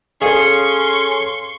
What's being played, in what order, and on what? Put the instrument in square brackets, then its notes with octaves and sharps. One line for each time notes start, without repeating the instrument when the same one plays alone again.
[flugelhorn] C#4 [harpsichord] G#4 [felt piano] A4 F5 [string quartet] C6 C#6